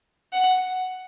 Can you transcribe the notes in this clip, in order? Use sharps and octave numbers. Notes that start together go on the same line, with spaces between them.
F#5